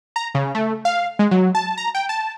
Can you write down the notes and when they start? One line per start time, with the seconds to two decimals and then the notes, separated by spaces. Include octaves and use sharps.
0.16 A#5
0.35 C#3
0.55 A3
0.85 F5
1.19 G#3
1.31 F#3
1.55 A5
1.78 A#5
1.95 G5
2.09 A5